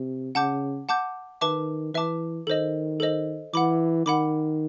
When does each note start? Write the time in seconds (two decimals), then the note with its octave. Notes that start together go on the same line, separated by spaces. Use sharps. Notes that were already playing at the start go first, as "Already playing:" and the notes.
Already playing: C3
0.35 C#3 F#5 A5 D6 G6
0.89 F#5 A5 D6 G6
1.41 D#3 B4 E5 A5 D6
1.94 E3 B4 E5 A5 D6
2.47 D#3 A4 C5 D#5
3.00 A4 C5 D#5
3.54 E3 F#5 B5 D6
4.06 D#3 F#5 B5 D6